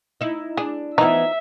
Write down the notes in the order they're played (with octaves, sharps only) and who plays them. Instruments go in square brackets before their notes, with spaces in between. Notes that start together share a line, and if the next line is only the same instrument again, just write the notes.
[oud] D#4 E4
[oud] D4 [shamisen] G#4
[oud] E3 B3 [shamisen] F3 D#4 [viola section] E5